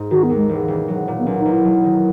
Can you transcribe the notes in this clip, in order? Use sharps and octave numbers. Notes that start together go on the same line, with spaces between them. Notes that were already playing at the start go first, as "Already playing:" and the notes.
Already playing: G#2 D#4
D#3 F#4
B3
D#2
G#3
E1
E1
F#3
A#2
B3
B1 C#4
D#4
B1
E4
F#3
D#3